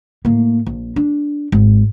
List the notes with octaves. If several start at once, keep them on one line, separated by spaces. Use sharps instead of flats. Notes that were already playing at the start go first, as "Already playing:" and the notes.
A2 A#3
A#1
D4
G#1